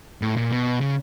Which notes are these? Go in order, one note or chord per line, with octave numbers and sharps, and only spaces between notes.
A2
A#2
B2
C#3